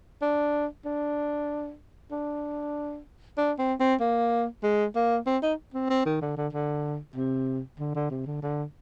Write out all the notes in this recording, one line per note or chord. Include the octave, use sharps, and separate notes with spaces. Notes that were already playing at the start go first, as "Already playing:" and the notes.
D4
D4
D4
D4
C4
C4
A#3
G#3
A#3
C4
D#4
C4
C4
D#3
D3
D3
D3
C3
D3
D3
C3
D3
D3